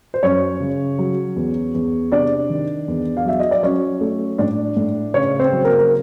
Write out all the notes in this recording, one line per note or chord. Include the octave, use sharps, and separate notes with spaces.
C5
F#2 C#4 C#5
C#3
F#3
E2
E2
C3 D4 D5
D#3
E2
F5
F#3 E5
D#5
D5
F#3 C#4 C#5
A3
A2 D4 D5
A2
C#3 C#4 C#5
C4 C5
F#3
A#3 A#4
A#4